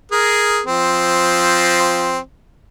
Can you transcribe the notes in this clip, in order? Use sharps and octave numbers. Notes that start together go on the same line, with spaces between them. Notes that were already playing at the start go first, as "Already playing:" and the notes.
G#4 A#4
F3 C4